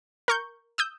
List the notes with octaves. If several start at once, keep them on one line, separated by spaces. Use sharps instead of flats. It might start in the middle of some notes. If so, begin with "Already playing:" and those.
A#4 C#6 G6
D#6 E6 G6